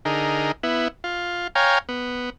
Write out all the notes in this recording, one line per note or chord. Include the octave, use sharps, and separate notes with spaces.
D3 D#4 G#4 A#4
B3 E4
F4
C#5 F5 G5 G#5 A#5
B3